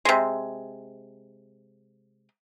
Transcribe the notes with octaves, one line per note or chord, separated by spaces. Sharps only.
C3 G#3